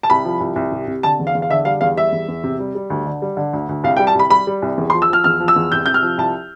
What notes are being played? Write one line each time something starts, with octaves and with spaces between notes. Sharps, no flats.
A5
C2 B5
F3
C2
C2
C3
C3
D3 A5
E2
F5
E2
F5
D3 E5
G3 F5
E2 F5
G3 E5
E2
E2
C3
G3
G3
D2
D3
G3
D3
D2
D2
C2 F5
G5
G3
A5
C2 B5
G3 B5
G3
C2
E2
C6
F3
E6
F3 F6
E2 F6
F3
E6
E2
C2 G6
C3 G6
F6
F3
C2 A5